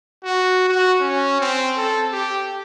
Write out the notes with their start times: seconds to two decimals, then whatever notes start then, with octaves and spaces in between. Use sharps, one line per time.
0.24 F#4
0.68 F#4
1.01 C#4
1.40 C4
1.77 A4
2.12 G4